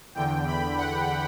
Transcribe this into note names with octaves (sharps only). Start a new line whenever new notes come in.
E2 D3 G5
B5
F#5